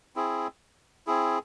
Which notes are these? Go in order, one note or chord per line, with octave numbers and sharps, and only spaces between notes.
C4 E4 G#4
C4 E4 G#4